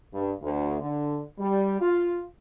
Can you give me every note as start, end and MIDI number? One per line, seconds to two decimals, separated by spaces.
0.14 0.31 43
0.43 0.80 38
0.81 1.21 50
1.39 1.80 55
1.81 2.21 65